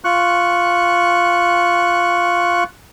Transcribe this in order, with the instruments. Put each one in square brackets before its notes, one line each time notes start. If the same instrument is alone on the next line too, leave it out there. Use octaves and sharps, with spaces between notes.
[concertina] F4 C#6 F#6